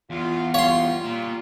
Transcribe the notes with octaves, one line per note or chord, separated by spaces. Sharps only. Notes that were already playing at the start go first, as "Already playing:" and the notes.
E2 F4
G3 F4 C#5 F5 C6
A#2